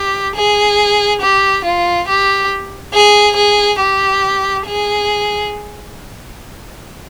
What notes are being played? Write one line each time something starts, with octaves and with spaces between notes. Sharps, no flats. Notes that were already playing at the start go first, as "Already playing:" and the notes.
Already playing: G4
G#4
G4
F4
G4
G#4
G#4
G4
G#4